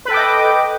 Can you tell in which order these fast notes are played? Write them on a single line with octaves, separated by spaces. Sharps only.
B4 A4 G5 D6 D#5